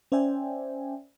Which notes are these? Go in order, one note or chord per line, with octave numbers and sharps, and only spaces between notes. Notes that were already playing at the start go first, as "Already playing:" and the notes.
C#4 C5 D5 E5 G5 G#5